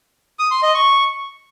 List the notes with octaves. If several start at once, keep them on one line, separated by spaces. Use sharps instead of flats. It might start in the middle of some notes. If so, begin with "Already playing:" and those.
D#6
C6
D#5
C#6